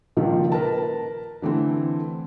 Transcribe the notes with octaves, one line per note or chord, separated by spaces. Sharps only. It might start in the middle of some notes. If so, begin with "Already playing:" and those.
C#2 A#2 D#3 F3
A#4 B4 A5
D3 E3 A3 C4